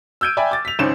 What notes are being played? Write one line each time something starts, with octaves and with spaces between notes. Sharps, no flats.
E6 F6 G6 G#6 D7 D#7
D5 E5 G5 G#5 B5
D6 A6
B6 F7
G#1 C#2 G#2 C#4 C6 E7